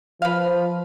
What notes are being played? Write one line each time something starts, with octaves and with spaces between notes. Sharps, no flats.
F3 B4 F5